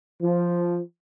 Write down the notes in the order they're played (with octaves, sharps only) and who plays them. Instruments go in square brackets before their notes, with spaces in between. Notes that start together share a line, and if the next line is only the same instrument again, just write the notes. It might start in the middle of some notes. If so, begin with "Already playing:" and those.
[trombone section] F3